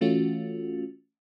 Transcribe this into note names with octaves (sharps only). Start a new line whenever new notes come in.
E3 A3 C#4 F4 F#4